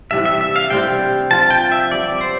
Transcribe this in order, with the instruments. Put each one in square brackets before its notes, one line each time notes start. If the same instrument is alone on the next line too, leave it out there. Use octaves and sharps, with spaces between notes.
[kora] C3 E3 G3 D4 [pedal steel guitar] E5
[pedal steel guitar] E5
E5
F5
[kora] C3 G3 C4 E4 [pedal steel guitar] G5
[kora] F3 C4 F4 [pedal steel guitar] A5
[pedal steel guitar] G5
E5
[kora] G3 B3 D4 [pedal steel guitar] D5
[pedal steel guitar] C5